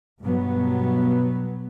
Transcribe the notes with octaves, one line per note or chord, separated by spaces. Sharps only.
G2 B2 F#3 B3